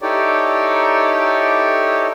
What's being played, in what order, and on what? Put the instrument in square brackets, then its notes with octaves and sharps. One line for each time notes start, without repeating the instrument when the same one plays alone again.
[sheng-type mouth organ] D#4 E4 G4 A4 C#5 D5